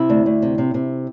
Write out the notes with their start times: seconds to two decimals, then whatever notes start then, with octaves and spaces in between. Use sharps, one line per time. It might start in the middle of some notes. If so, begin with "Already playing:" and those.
Already playing: C3 E4
0.10 D2
0.26 D2
0.42 C3
0.58 C3
0.74 C3